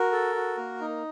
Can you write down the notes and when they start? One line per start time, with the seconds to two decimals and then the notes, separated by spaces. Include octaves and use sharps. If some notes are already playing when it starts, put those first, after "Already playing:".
Already playing: F#4 A#4
0.12 A4
0.35 F#4
0.57 A#3
0.81 D#4